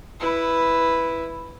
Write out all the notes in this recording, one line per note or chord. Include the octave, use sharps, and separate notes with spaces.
E4 B4